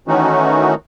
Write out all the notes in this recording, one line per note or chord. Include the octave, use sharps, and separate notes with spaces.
D#3 E3 A3 C#4 D#4 F#4